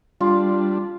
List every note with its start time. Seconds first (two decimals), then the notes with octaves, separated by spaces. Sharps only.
0.21 G3 D4 F4